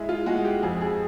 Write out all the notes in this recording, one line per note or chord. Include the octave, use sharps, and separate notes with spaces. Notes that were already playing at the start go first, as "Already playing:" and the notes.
Already playing: G#3 E4
F4
G#3 F#4
G4
F2 G#4
G#4